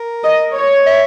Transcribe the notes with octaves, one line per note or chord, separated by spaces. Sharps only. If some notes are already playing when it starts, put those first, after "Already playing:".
Already playing: A#4
D#5
C#5
E5